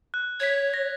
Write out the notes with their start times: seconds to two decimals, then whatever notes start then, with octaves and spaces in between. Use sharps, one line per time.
0.14 F#6
0.40 C#5 G#6 B6
0.74 A#6